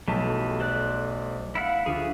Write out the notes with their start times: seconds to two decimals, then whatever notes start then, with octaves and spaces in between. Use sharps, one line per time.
0.08 B1 E3 G3 A3 G4 G#4 A5
0.60 C5 D5 F#6
1.55 E4 F5 F#5
1.86 D2 F4 G4 G#4